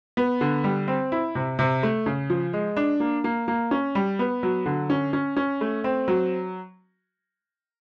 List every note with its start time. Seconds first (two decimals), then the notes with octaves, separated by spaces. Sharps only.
0.17 B3
0.41 D3
0.64 G3
0.88 C4
1.12 E4
1.35 C3
1.59 C3
1.83 A3
2.06 C#3
2.30 F3
2.53 G#3
2.77 D4
3.00 A#3
3.24 A#3
3.48 A#3
3.71 C#4
3.95 G3
4.19 B3
4.43 F#3
4.66 D3
4.90 C#4
5.13 C#4
5.37 C#4
5.61 A3
5.84 C4
6.08 F#3